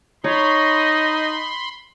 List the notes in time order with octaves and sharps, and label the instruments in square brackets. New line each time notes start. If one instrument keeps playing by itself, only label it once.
[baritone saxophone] D#4 [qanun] C#5 [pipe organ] B5 C6